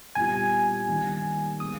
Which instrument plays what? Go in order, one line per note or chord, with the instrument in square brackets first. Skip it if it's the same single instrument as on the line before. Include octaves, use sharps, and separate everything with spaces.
[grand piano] A#2 G3 B3 E4 G4 [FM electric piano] G#5
[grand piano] D#3 G3 A#3 D#4
[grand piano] G#3 B3 [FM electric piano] D#6